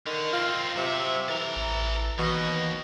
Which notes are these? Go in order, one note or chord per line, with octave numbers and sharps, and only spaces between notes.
D3 D#3
C4 D#4 F4
C3 F#3 E5
E3 A4 A#5
A1
D#2 B2 E3 D#5